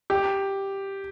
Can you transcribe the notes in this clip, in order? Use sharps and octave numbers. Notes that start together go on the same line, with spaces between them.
G4